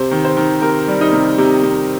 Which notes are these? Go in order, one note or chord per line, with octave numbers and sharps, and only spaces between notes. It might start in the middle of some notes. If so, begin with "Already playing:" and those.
Already playing: C3 C5
D#3
C5
D#3
C3 A#4
G3
D#4
C3
C3
C3